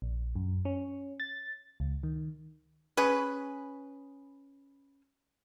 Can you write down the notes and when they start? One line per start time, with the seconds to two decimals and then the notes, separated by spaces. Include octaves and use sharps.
0.02 A#1
0.36 F#2
0.65 C#4
1.20 A6
1.80 C#2
2.03 D#3
2.97 C#4 G#4 B4